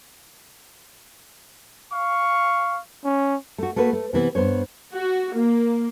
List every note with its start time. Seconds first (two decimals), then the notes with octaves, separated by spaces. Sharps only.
1.92 F5 C#6
3.05 C#4
3.58 A3 F#4
3.76 A3 A#3 F#4 B4
3.93 A3
4.13 C3 E3 B3
4.35 G2 B3 C5 C#5
4.95 F#4
5.35 A#3